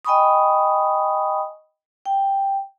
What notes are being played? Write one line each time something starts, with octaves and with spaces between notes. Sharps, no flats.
D#5 G5 G#5 B5 C#6 D#6
G5